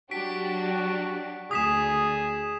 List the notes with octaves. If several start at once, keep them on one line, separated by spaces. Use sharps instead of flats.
F#3 D4 F#4 G4 B6 D7
D2 G#4 D#6 B6 E7